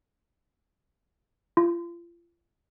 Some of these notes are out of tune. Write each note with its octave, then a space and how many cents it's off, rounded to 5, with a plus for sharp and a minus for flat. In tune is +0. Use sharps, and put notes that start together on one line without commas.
F4 -35